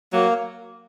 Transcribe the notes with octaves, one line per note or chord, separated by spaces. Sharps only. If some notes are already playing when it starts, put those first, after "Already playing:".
F#3 A#3